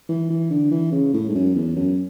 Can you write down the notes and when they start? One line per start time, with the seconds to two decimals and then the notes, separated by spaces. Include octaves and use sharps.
0.09 E3
0.30 E3
0.51 D3
0.71 E3
0.92 C#3
1.14 A2
1.29 G#2
1.35 F#2
1.56 E2
1.76 F#2